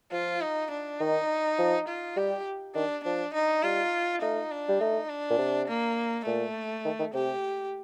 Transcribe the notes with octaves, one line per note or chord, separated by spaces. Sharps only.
F3 F4
D#4
D4
D#3 D#4
F3
F4
G3 G4
D#3 D4
F3 D4
D#4
G3 F4
A3 D#4
D4
G3
A3 D#4
D4
A#2
C3
A#3
A#2 A3
D#3
D#3
C3 G4